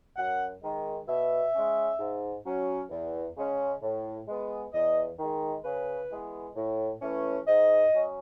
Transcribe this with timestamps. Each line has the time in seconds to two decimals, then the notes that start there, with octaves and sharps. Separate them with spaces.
0.17 F#2 F#5
0.63 D#3 G#3
1.08 B2 E5
1.54 G#3 C#4
1.99 G#2
2.45 F#3 C#4
2.90 E2
3.37 C#3 G#3 C#4
3.82 A2
4.27 G#3 B3
4.73 E2 D#5
5.19 D#3 G#3
5.64 C#3 B4
6.11 E3 G#3 B3
6.56 A2
7.02 E3 A3 C#4
7.47 G#2 D#5
7.93 F#3 C#4